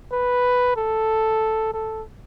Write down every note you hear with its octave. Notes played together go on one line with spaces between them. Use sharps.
B4
A4
A4